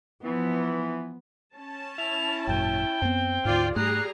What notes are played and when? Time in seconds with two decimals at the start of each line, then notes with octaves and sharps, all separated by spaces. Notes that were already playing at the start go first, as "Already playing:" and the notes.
0.24 E3 F3 B3
1.56 C#4 A5
1.98 E4 F7
2.47 G#1 F#2 A#2 G5
3.02 F#2 B3 C4
3.45 D2 G#2 F4 D5
3.76 G#2 G3 A3 G#4 A#5 F#6 C7